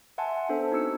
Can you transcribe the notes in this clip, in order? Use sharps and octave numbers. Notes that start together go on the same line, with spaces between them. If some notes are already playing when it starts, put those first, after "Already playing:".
E5 F#5 G#5 A5 C6
B3 D4 A4 C5
C4 D#4 F#4 E6 C#7